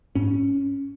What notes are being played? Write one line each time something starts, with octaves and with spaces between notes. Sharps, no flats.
G#2 C#4